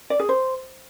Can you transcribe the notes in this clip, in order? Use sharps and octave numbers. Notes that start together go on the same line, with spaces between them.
D5
G#4
C5